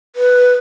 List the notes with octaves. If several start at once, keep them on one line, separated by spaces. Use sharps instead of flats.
B4